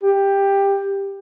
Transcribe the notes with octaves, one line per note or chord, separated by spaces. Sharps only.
G4